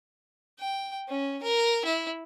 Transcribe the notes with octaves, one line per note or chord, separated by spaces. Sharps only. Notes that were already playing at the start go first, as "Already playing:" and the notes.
G5
C#4
A#4
E4